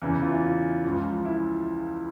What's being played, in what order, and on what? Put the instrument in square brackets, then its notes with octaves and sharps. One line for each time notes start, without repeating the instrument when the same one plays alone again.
[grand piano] E2 C#3 E3 E4
F4
E4
F4
C#2 C#3 F3
E4